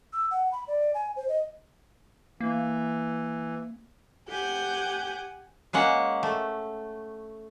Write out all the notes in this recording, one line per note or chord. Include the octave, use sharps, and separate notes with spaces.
E6
F#5
B5
D5
G#5
C5
D#5
E3 A#3
G4 F#5 G#5 G6
G#3 A#3 C#4 F#5
A3